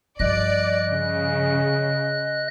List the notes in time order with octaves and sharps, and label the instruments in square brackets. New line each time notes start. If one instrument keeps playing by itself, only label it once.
[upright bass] G2 F3 [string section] D5 [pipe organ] D#5 F#6
[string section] C#3